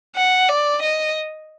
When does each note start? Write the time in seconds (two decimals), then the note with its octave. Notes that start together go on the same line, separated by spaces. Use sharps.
0.16 F#5
0.49 D5
0.83 D#5